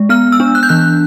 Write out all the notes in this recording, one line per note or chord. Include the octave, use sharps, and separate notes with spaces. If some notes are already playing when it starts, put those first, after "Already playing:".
Already playing: G#3
B3 F6
E6
D4
F#6
G6
E3 F#6